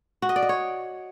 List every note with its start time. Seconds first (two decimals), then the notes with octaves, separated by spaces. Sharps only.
0.22 F#4
0.29 D#5
0.36 D5
0.43 D#5
0.49 C#5